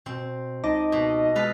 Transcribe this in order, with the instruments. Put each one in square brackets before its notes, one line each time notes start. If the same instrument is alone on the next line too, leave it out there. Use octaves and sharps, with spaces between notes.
[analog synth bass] B2 [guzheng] C4
[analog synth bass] C#2 [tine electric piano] D#4 A5 D6 [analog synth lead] D#5
[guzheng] B2
[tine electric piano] G#3 [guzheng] A4 B4 F5